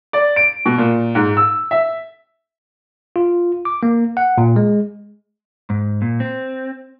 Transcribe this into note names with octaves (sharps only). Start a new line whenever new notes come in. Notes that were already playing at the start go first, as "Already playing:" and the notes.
D5
D7
B2
A#2
G#2
E6
E5
F4
D6
A#3
F#5
A#2
G#3
G#2
A#2
C4